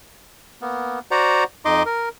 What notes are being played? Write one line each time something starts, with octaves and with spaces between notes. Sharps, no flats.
A#3 B3
F#4 C5 D5 F#5 A#5
F2 D#4 D#5 C6 D6
A#4